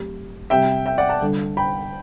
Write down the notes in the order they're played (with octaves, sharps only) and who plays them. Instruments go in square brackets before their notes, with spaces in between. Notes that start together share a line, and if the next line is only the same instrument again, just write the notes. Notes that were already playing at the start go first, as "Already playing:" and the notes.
Already playing: [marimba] F#3 A3 C4 G4
[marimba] C3 G3 C4 G4 B4 [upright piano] E5 G5
[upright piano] E5 G5
D5 F#5
F#5 A5
[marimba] D3 G3 D4 A4
[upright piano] G5 B5